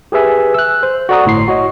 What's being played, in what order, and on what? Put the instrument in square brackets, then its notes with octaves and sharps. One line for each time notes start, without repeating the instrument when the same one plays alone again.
[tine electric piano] G4 G#4 B4 E5 G#5
E6 F#6
C5
F#4 A4 D5 F#5 A#5 D#6
G1 A2 C6 C7
F#4 C#5 D#5